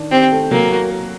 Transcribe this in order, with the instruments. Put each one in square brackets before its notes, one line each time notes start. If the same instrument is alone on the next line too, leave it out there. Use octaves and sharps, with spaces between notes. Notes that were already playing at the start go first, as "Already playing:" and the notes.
Already playing: [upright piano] D#3 D4
[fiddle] C4 [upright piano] G4
[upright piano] A3
[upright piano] F#3 [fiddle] A#3
[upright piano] F#4
A#4